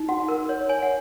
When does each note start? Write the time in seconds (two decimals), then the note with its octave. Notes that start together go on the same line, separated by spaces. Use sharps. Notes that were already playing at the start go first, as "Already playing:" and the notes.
Already playing: D#4
0.09 F#4 F#5
0.28 A#4
0.49 C#5
0.69 C#5 G#5
0.83 F#5